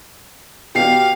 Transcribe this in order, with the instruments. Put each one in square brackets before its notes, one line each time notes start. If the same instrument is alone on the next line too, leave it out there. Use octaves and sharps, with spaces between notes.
[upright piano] B2 C7 [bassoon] G4 [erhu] F5